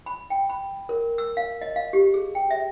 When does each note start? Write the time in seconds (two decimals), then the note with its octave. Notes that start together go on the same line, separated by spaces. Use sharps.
0.06 B5
0.30 G5
0.49 B5
0.89 A#4
1.18 E6
1.37 F5
1.61 D#5
1.76 F5
1.93 G4
2.14 G#4
2.35 G5
2.51 E5